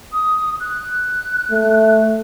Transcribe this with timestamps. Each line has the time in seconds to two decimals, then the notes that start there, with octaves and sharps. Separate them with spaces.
0.12 D#6
0.60 F#6
1.51 A3